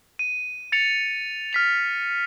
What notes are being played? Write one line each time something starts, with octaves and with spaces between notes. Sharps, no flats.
D#7
A6 C#7 F7
F6 B6 F7